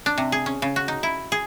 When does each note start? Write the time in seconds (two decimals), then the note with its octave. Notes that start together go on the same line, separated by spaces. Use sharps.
0.06 D4
0.18 C3
0.32 G#4
0.46 C#4
0.62 C#3
0.76 F#4
0.88 D#4
1.03 E4
1.32 G#4